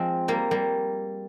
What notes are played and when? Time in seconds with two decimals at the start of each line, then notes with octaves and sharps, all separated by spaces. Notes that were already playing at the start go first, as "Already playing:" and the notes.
Already playing: F3 G#3 C4
0.28 G3 A#3
0.51 G3 A#3